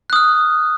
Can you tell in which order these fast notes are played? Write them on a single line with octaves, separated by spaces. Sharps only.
F#6 D#6 F6